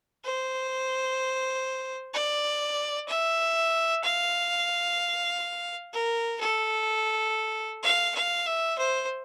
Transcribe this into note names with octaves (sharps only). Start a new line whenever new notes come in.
C5
D5
E5
F5
A#4
A4
F5
F5
E5
C5